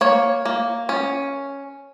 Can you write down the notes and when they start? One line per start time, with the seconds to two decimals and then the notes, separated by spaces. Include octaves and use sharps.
0.01 A#3 C#5
0.45 A#3
0.89 C#4